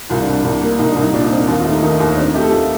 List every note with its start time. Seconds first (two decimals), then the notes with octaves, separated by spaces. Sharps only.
0.09 C2 F4
0.22 D4
0.27 C2
0.33 D4
0.44 C2 D4
0.62 A#3
0.79 C2 D#4
0.90 D4
0.96 C2
1.02 D#4
1.13 A#2 D4
1.19 F4
1.25 D#4
1.31 C4
1.37 D#4
1.48 D#2 F4
1.60 F4
1.65 A3
1.71 D#4
1.82 D#3 D#4
2.00 D#2
2.16 C4 D4
2.26 D#4
2.34 A3 G4
2.42 A4
2.51 A3 F4